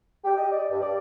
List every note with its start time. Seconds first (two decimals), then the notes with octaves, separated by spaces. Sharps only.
0.24 G4
0.38 D#5
0.51 D5
0.71 G2
0.82 D5